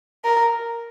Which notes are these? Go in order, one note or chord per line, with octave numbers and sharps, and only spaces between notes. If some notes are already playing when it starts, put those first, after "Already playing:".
A#4